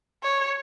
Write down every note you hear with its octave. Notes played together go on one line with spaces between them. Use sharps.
C#5